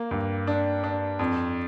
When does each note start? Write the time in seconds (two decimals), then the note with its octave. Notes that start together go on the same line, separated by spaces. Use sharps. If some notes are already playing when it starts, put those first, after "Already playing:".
Already playing: A#3
0.11 G2
0.47 D4
0.84 D4
1.19 F2